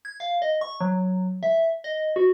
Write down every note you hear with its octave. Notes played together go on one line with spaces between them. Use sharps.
G#6
F5
D#5
C#6
F#3
E5
D#5
F#4